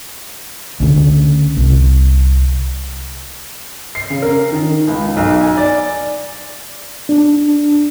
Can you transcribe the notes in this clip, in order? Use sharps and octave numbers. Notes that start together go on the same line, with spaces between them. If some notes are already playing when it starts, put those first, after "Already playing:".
D2 C#3
C2
C7
C#3
A#4
D#3
C#2
B1
G#5
D5
D4